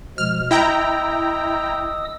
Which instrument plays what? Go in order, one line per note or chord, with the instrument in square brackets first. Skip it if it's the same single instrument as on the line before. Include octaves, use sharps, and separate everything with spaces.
[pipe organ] B2 F3 G#3 [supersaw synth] F6
[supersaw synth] E4 G5 A#5 [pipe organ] D#5 D#6 E6